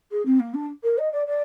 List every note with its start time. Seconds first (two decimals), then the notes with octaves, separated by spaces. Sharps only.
0.11 G#4
0.25 C4
0.40 A#3
0.54 D4
0.83 A#4
0.98 D#5
1.12 D5
1.26 D5